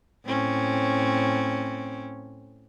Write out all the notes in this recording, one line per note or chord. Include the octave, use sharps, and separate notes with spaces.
A2 C4 C#4